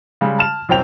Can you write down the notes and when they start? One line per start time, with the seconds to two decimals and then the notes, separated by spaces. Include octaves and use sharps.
0.21 C#3 G3 G#3
0.39 A5 F6 E7
0.69 C2 F#2 C4 G5 F7